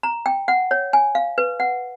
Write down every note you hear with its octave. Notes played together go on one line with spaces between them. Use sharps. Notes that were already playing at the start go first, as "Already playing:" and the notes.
A#5
G5
F#5
C#5
G#5
F5
B4
F#5